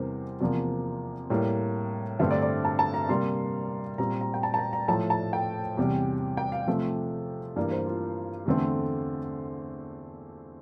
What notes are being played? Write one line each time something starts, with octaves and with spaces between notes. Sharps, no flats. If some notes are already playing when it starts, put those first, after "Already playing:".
Already playing: E2 C3 E3 G3 A#4 C5
E2 C3 F3 A#3 D5
A2 G3 A#3
G2 D3 A3 C4 E5
D5
D5
A5
A5
A#5
C3 G3 A#3 C6
A#2 G3 C4 A#5
A#5
G5
A5
A5
A#5
A#5
A2 F3 A3 A5
A5
G5
E2 C3 G3
G5
F5
C3 F3 A3 C4
G2 E3 A#3 D5
C5
F4
E2 D3 A3 C4